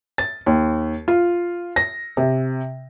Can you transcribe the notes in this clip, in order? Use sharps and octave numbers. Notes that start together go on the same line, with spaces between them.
A6
D#2
F4
A#6
C3